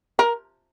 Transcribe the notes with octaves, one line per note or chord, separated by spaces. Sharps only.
A#4